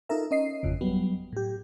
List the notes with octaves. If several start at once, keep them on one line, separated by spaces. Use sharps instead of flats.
D#4 F4 A4 A#4 E5
C#4 D#5 C7
G#1 F2 C#3
F#3 G3 B3
A2 G4